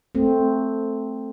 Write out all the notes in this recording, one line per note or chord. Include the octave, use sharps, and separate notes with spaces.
A3 C4